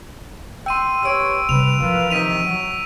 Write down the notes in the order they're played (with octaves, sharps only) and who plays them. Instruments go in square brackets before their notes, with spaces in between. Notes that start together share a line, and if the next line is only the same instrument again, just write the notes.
[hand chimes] G5 C6 [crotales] E6 D#7
[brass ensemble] G4 B4 C#5 [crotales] E6 D7
[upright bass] C3 G3 [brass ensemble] B4 [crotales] F7
[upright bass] E3 F3 [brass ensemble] F4 A#4 B4
[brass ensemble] C3 D#3 [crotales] B6 D#7 F7
[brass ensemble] F#3